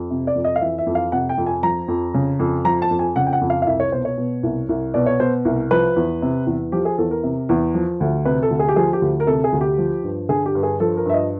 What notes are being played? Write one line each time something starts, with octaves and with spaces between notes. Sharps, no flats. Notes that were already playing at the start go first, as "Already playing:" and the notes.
Already playing: F2
C3
D5
F2
D#5
F5
E3 E5
E5
F2
F5
C3 F#5
G5
F2
G#5
F3 A#5
F2
C#3
F2
F3 A#5
A5
F2
G#5
C#3 F#5
G5
F#5
F2
F5
F5
C2 E5
C#5
B2 C5
C#5
B2
C2
C2
B2 D5
C#5
B2 C5
C2
F3 B4
E2
C3
E2
F3 G4
G#4
E2 A4
A#4
C3
E2
F3
D2
C3 B4
A4
D2
G#4
G4
F3 G#4
G4
D2
A#4
C3 A4
G#4
D2
G4
F3
G2
D3 G#4
G4
G2
G#4
F3 A4
A#4
G2 E5
D#5